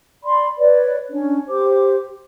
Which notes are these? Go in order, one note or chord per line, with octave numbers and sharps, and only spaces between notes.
D5 B5 C6
B4 C#5 D5
C#4 D4 C#5
G4 C5 D6